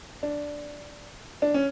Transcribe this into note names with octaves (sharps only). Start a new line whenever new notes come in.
D4
D4
C#4